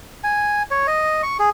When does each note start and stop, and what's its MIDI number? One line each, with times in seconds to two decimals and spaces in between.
0.24 0.63 80
0.71 0.87 73
0.87 1.22 75
1.23 1.37 85
1.40 1.50 68